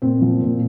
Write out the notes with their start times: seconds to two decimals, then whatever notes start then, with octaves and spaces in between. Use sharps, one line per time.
0.02 A#2 C4
0.21 F3
0.42 A#2